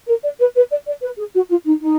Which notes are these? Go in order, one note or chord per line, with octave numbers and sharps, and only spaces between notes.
A#4
D5
B4
B4
D5
D5
B4
G#4
F#4
F4
D#4
D#4